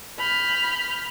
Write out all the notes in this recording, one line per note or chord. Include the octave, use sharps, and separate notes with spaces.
B5 F6 G6